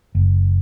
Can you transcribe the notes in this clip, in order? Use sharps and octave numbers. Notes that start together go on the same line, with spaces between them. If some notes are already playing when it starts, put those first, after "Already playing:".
F#1